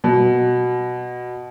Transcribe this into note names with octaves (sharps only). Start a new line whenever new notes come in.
B2